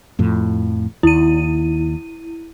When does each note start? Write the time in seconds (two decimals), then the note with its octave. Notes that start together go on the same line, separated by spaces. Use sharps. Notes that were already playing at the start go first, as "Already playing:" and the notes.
0.19 F2 A2 F3
1.03 D#2 E4 D#7